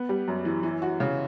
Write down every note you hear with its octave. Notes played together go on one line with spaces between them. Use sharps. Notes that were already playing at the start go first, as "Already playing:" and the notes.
Already playing: B3
G3
F#2
E3
E3
F#4
C#3